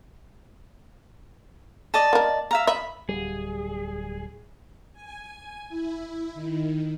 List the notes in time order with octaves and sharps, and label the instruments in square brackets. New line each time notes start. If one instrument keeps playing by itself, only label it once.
[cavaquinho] D5 D#5 A5
[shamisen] A#3 A#4
[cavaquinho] E5 F5 A#5
[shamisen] D#5 E5 [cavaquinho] B5
[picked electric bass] D1 G3 [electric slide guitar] G#4
[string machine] G#5
E4
D#3